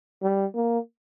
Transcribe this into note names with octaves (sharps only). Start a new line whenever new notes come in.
G3
A#3